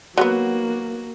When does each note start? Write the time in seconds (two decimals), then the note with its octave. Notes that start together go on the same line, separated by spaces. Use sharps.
0.18 F#3 G3 A#3 B3 F#4